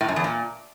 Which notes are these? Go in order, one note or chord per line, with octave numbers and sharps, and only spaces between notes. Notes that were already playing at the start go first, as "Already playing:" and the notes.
A2
F#2
E2
A#2